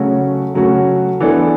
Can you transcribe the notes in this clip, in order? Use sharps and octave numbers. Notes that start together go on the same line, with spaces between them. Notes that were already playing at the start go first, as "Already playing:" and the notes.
Already playing: C#3 F#3 A3 C#4 F#4
C#3 F#3 A3 C#4 F#4
E3 B3 D4 A4